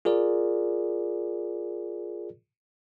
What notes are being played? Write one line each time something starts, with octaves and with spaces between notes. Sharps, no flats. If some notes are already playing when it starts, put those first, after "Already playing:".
F4 G#4 A#4 D5